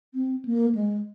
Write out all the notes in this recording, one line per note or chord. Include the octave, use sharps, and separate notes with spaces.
C4
A#3
G#3